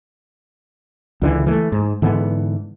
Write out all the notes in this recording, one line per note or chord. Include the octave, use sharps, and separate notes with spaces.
C#2 D3 E3
E3 G#3 A3
G#2
G#2 D3 E3 B3